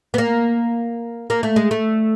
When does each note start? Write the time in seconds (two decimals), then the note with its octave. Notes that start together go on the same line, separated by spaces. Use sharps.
0.14 B3
0.18 A#3
1.30 A#3
1.43 A3
1.56 G#3
1.71 A3